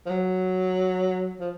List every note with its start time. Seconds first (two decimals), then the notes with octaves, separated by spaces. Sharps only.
0.06 F3
0.10 F#3
1.40 F3